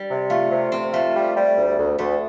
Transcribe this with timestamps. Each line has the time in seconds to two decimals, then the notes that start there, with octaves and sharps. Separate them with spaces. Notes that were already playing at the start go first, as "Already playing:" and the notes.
Already playing: G3
0.09 C3
0.30 A3 F4
0.51 C3
0.72 C3 C4
0.93 A3 F4
1.14 G3
1.36 G3
1.57 D2
1.77 D2
1.98 D2 A3